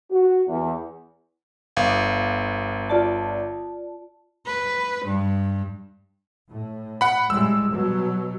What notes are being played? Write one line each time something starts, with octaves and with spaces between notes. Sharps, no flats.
F#4
E2
G1 F5
F4 D5 A5
B4
G2
A2
F#5 B5
A2 G3 G#3 E6
B2 F#3 G3